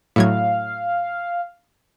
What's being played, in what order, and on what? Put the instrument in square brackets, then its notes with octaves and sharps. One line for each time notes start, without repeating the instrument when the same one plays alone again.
[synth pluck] A2 F#3 G#6 [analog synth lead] F5